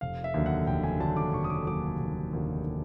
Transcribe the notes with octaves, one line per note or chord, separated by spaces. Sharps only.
F1 F5
E5
D#2 D3 F#3
F#5
F1 G5
G#5
D#2 D3 F#3 A5
D6
F1 C#6
D#6
D6
D#2 D3 F#3 D6
F1
D#2 D3 F#3